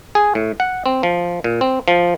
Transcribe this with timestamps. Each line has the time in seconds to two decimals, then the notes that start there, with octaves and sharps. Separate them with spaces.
0.15 G#4
0.35 A2
0.60 F#5
0.86 C4
1.03 F3
1.44 A#2
1.61 C4
1.88 F3